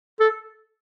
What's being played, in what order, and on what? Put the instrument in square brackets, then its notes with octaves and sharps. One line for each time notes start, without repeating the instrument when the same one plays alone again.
[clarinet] A4